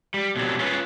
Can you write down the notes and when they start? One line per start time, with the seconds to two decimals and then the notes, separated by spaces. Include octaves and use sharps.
0.14 G3
0.36 B2 D3 F#3 G3 C4
0.59 C#4 F4 A#4 B4